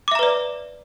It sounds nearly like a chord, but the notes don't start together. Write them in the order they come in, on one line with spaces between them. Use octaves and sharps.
D6 E5 A#5 B4 D5